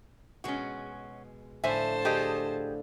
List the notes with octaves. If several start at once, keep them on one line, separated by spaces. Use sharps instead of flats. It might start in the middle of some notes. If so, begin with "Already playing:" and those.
B2 G#3 C#4 F#4
A2 D3 F3 C5 E5 G#5 A5
D3 G4 G#4 D#5